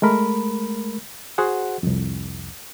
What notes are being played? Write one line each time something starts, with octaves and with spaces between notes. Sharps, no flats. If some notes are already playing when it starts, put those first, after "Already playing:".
G#3 A3 A#4 B5
F#4 G#4 C5 F#5
C2 F2